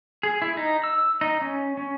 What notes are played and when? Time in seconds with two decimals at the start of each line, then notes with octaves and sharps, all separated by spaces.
0.23 G#4
0.42 E4
0.57 D#4
0.84 E6
1.21 D#4
1.42 C#4
1.77 C#4